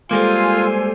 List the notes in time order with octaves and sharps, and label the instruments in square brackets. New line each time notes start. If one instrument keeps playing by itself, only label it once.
[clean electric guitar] G3 G#3 A#3 [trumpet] F4 [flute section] A4 C5 G#5